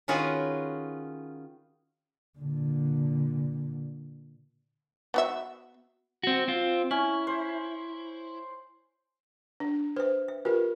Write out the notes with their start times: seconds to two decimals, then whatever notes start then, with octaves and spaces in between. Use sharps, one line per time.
0.08 D#3 C#4 F4 F#4 G#4 B4
2.39 A#2 D3
5.14 B3 F#4 E5
6.23 C4 F#4
6.48 C4 F4
6.91 C#4 E4
7.27 C5
9.60 D4
9.96 B4 C5 E5
10.28 E5
10.45 F4 G4 A#4 B4